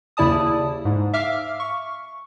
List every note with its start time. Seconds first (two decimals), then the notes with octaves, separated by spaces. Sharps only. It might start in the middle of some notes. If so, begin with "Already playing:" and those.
0.17 D#2 C#3 E4 D5 A5 D#6
0.85 G#2
1.13 E5 F5 D6 F6
1.60 C#6